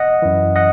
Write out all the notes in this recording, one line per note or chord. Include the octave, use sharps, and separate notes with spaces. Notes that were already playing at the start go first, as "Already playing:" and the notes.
Already playing: D#5 F#5
F#2 E3
D#5 F#5